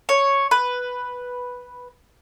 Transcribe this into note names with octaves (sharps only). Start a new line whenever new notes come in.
C#5
B4